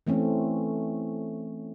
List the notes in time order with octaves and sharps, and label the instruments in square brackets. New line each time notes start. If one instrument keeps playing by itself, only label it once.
[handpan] E3 A3 C4 C#4